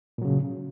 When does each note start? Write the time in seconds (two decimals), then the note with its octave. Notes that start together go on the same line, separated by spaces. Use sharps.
0.18 A#2
0.22 F#3
0.25 C#3